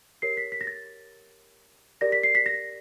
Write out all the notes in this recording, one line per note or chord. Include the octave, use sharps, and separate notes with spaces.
G4 A#4 C#5 C7
B6
B6
A#6
A6
G4 A#4 D5 A#6
B6
C7
B6
A#6